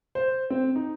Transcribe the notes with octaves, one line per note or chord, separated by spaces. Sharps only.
C5
C4
D#4